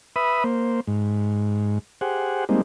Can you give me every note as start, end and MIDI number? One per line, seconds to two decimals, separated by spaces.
0.16 0.44 71
0.16 0.44 76
0.16 0.44 83
0.16 0.44 87
0.44 0.80 58
0.44 0.80 72
0.87 1.79 44
2.01 2.45 67
2.01 2.45 68
2.01 2.45 72
2.01 2.45 78
2.49 2.61 55
2.49 2.61 56
2.49 2.61 58
2.49 2.61 60
2.49 2.61 63